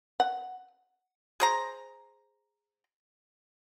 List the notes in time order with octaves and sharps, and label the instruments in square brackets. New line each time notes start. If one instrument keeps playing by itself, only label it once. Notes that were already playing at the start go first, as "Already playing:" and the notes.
[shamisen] F#5
[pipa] G#4 C5 A#5